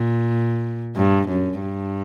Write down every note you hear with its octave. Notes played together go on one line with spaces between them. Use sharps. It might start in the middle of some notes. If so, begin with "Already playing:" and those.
Already playing: A#2
G2
F#2
G2